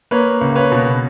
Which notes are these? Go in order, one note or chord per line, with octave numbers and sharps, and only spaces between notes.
A#3 B4 C#5
C#2
B4 C#5
B2